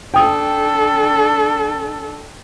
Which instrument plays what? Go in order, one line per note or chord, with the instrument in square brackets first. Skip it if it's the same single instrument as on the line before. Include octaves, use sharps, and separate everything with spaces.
[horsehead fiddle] D4 A4 [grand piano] G5 D#6